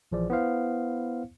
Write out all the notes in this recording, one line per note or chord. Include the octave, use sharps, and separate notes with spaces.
A#1 E3 F3 G#4 D5
B3 E4 C5 F5